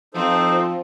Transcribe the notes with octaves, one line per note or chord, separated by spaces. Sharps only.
F3 C4 D#4 A4 C5